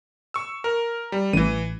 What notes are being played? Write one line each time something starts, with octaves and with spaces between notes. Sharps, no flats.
C#6 E6
A#4
G3
A1 E3 D#7